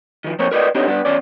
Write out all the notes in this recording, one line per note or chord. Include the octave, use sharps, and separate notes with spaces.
D#3 F3
F3 A#3 C4 A#4 C5 C#5
A#4 B4 D5 D#5
B3 C4 D4 D#4 G4 C#5
G2 B3 D4
E2 C#4 D5